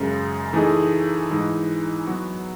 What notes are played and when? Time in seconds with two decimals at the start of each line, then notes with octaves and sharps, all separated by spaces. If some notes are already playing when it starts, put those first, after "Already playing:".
Already playing: F#2 C#3 G#3
0.53 E3 A3 D#4 G#4
1.30 G#2 E3 G#3 D#4
2.07 F#3 B3 F#4